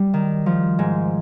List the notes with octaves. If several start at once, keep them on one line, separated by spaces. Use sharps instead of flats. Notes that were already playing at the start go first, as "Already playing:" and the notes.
Already playing: G3
D#3
F3
G#2